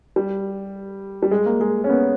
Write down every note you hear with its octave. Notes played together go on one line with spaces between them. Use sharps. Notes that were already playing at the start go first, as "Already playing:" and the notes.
G3
G3
G#3
A#3
G#3
C#4
B3